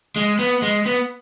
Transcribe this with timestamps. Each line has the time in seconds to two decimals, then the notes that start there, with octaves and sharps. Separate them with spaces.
0.16 G#3
0.39 B3
0.62 G#3
0.86 B3